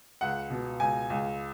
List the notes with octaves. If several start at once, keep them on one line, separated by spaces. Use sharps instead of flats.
C#2 F#5
B2
C#2 G#5
C#2